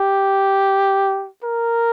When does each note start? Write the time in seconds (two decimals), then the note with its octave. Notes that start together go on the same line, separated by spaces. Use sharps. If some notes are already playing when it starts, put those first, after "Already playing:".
Already playing: G4
1.44 A#4